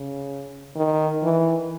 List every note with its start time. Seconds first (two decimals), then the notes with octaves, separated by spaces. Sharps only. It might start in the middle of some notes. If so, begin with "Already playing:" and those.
Already playing: C#3
0.76 D#3
1.23 E3